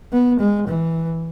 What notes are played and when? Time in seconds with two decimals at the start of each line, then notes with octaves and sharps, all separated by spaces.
0.13 B3
0.40 G#3
0.68 E3